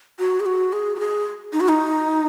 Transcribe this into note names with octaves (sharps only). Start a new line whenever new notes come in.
F#4
G#4
F#4
G#4
F#4
G#4
D#4
F#4
D#4